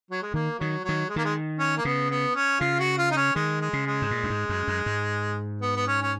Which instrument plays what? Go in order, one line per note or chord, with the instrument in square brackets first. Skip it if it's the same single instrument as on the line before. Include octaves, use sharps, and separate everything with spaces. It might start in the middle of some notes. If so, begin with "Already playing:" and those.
[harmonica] F#3
G#3
[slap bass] D#3 [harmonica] A#3
[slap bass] D#3 [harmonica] F#3
[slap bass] D#3 [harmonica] F#3
[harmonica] G#3
[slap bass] D#3 [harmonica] A#3
[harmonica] G#3
C#4
A#3
[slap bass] C#3 [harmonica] B3
[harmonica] B3
C#4
[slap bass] C#3 [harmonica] F4
[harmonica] F#4
F4
D#4
C#4
[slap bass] D#3 [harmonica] G#3
[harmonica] G#3
[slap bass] C#3
[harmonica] G#3
[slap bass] G#2
A#2
F#2
G#2
F#2
F#2
G#2
[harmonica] B3
B3
C#4
C#4